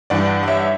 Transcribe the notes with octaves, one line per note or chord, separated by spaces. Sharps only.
G2 E3 D5 F#5
F#5
C#5 E5